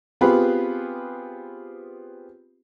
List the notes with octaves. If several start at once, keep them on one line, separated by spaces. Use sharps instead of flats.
B3 C4 F4 G4 G#4 B4